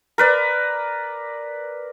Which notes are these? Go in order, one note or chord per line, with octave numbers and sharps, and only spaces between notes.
A#4 B4 D5